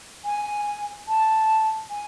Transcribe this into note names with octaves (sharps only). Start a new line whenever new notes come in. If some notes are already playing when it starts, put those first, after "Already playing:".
G#5
A5
G#5